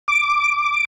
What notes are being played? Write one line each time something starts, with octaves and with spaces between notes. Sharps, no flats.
D6